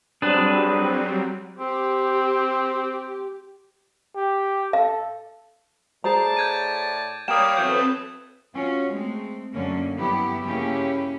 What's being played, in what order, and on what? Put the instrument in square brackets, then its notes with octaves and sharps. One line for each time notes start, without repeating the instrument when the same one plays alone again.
[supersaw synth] F#3 G3 C4 [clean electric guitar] D4 [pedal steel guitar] G#4 B4
[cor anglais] C4 [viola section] G4
[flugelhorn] G4
[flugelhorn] A4 [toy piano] F5
[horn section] A2 D5 A5 [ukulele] G#4 C5 A#5
[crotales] G6 G#6 D#7
[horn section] G3 A#3 [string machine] C#5 F5 [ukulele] G5 [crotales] D#6 E7
[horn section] B2 E3 F#3 [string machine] C4 A4 B4 [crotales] G6
[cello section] C#4 F4 F#4
G#3 A3 C4
F#2 D3 F#3 A#3 C#4
G2 F#3 B3 E4 G4
C#3 A#3 C#4 E4 G4